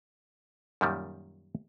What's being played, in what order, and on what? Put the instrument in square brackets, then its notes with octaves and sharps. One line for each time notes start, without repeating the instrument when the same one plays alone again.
[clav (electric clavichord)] F#2 A#2 D#3 G3